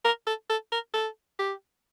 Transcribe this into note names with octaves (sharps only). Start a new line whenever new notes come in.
A#4
A4
A4
A#4
A4
G4